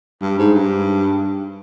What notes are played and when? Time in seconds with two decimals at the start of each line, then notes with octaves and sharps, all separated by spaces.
0.21 G2
0.39 G#2
0.56 G2